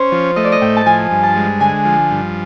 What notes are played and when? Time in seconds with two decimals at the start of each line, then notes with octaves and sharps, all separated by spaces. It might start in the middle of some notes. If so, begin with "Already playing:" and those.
Already playing: C#4 C5
0.12 F3
0.36 A3 D#5
0.44 D5
0.52 D#5
0.62 A2 G5
0.77 A5
0.86 F3 G#5
1.11 G2
1.23 A5
1.36 G#3
1.60 D3 G#5
1.85 F3
2.11 G2